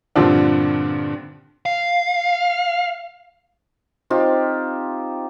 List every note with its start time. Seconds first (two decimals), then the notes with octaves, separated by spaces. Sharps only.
0.15 G2 A#2 D3 F3 C4 D4
1.66 F5
4.10 C4 D#4 F4 G4